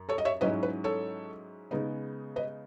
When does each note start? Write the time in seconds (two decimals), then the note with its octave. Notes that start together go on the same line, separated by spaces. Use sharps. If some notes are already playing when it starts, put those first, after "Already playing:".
Already playing: F#2
0.09 A4 C#5
0.18 D#5
0.25 C#5 E5
0.41 G#2 F#3 C#4 E4 B4 D#5
0.63 B4
0.84 A4 C#5
1.71 C#3 G#3 B3 D#4
2.36 B4 D#5